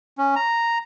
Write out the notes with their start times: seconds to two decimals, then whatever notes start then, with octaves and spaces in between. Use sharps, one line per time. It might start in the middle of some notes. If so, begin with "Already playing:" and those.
0.18 C#4
0.36 A#5